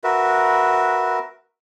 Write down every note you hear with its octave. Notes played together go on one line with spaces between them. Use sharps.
F#4 A#4 B4 E5